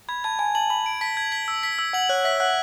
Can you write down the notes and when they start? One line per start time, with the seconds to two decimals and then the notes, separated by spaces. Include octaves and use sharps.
0.09 B5 G#6
0.24 A5 G#6
0.39 G#5 G#6
0.55 A5 F#7
0.70 B5 F#7
0.86 D7
1.01 A5 B6
1.17 G#6
1.32 B6
1.48 E6
1.63 B6
1.79 E6
1.93 F#5 F#7
2.09 C#5 F#6
2.25 E5 B6
2.40 F#5 F#6